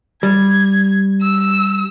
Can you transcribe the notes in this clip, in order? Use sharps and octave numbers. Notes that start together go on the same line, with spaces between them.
G3 G#6
E6